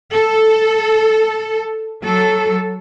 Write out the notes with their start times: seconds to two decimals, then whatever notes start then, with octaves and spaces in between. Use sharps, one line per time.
0.13 A4
2.00 F#3 A4